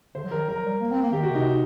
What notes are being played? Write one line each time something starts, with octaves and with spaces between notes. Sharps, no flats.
D3 C5
F#3
D#3 A#4
F#3 A#4
G3
A#3
C4
A#3
D#3 G4
F#4
C3
D#4